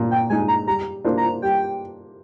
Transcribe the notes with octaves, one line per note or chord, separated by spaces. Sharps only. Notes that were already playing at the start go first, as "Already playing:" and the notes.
Already playing: A#2
G5
G#3 D#4 G#5
A#5
G3 A#5
A#3 D4 F4 C5
A#5
G3 G5